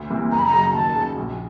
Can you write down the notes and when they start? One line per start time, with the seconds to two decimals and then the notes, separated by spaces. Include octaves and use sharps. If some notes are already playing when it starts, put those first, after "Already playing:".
Already playing: D2
0.10 C3 E3 G3 A#3
0.31 F#1 A#5
0.39 B5
0.45 A#5
0.53 F#2 C#3 F#3
0.74 D#2 A5
0.95 C#3 F#3
1.17 A#1